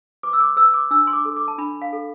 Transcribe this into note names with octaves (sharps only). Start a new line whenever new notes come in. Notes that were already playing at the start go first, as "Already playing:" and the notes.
B4 D6
E6
D6
B4 E6
D6
D4 E6
C6
D6
A4
D6
A5
D4 B5
F5
A4